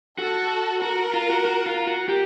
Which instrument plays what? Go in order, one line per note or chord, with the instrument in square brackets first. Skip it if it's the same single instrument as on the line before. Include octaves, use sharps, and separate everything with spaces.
[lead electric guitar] F#4 [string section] A4
[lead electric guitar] F#4 [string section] A#4
[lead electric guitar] F4
F#4
F#4
F4
F#4
G4